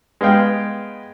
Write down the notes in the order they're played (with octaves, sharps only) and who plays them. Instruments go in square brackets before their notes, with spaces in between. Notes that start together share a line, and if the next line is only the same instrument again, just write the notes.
[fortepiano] G#3 B3 F5 G5